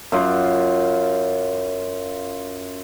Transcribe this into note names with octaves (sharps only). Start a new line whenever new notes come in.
F#2 F4